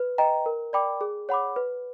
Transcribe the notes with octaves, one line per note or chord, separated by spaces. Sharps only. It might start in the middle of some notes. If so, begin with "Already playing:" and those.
Already playing: B4
D#5 G5 A#5
A#4
D5 G5 B5 D6
G#4
C#5 F#5 B5 D6
B4